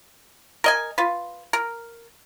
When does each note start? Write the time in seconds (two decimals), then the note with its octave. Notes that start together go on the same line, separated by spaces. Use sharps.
0.64 A#4 D#5 G#5
0.98 F4 B4
1.53 A#4